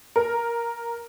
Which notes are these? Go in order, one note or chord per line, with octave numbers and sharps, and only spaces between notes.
A#4